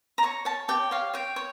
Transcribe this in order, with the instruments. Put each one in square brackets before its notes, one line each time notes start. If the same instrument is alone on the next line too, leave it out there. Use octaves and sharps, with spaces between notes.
[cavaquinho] A#5
C#5 C#6
C#5 A5
G4 G5
C#5 F5
C#5 G5
C#5